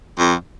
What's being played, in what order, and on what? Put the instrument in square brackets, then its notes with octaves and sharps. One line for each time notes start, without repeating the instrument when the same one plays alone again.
[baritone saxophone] F2